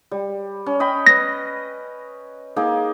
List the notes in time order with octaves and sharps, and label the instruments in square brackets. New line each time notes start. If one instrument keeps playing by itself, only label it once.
[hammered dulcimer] G3
C#4
D#5 G5 B5
[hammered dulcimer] B4 [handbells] A#6
[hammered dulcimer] A#3 D#4 G#4